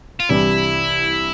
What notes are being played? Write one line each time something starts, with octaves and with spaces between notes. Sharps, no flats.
F4
C2 C3 E3 G3 D4 E4